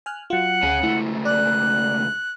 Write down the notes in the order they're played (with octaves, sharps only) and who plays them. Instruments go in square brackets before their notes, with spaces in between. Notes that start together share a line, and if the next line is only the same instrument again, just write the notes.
[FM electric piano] G#5 F6 F#6
[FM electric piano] F#3 F4 [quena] F#5
[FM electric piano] D2 [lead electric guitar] C#4 G#4
[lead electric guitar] C#2 A3 [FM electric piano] E4
[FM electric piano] D5 [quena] F#6